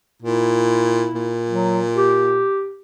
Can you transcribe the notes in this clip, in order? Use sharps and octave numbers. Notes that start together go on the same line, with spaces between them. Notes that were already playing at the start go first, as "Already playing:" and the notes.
A#2 E4
A#2
F#3
G4